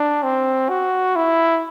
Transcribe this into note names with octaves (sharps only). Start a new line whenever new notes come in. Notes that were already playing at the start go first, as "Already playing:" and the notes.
Already playing: D4
C4
F#4
E4